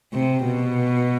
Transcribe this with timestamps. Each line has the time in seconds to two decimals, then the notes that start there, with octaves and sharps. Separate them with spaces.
0.13 C3
0.44 B2